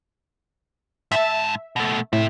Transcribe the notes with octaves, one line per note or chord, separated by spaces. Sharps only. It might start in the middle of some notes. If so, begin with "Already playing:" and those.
G#2 E5 A5
B2 A3
A2 C3 E5